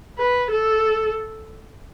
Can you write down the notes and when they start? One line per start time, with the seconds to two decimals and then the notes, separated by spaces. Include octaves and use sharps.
0.18 B4
0.51 A4